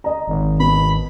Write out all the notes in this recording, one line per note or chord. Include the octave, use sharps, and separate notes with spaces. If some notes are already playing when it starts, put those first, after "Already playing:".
D#5 A#5
G#1
B2 B5